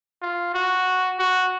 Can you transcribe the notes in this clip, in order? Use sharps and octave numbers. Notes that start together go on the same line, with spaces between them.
F4
F#4
F#4